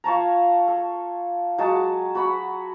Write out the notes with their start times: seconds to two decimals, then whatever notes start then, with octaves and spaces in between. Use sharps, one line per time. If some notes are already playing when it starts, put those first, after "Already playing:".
0.04 F4 C#5 A5 A#5
0.68 A4
1.58 F#3 G#3 F#4 A5
2.15 F#4 F#5 B5